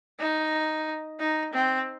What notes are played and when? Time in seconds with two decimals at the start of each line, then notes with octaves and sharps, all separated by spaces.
0.19 D#4
1.19 D#4
1.53 C4